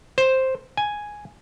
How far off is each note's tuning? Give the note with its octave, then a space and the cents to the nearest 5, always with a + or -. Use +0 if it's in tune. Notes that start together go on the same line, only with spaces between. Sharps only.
C5 +5
G#5 +0